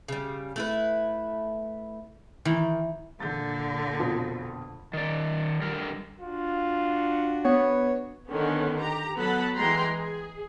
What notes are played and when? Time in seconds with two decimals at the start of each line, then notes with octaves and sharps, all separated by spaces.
0.08 C#3 G3
0.56 A3 E4 B4
2.45 D#3 E3
3.20 A#2 D3 G6 A6
4.00 F2 B2 F3
4.93 D#3 D5
5.62 D3 G3 A#4
6.22 D4 F4 F#4
7.45 B3 C#5
8.29 D3 D#3 B3 C#4
8.78 G4 A#5
9.18 F#3 B3 A4 F#5 A5 B5
9.55 E3 G#3 G5 A#5 C6
9.93 G#4